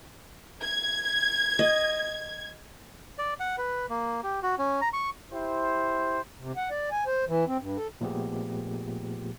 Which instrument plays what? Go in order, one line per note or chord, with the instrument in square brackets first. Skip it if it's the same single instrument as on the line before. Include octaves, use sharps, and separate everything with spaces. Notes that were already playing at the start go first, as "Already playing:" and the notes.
[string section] G#6
[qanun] D#5
[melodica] D5
F#5
B4
A#3
G4
F#4
C#4
A#5
C#6
[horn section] E4 G4 C5
[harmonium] C3
F#5
D5
G#5
C5
E3
C4
G2
A4
[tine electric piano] A#2 F3 A3 B3 G4 G#4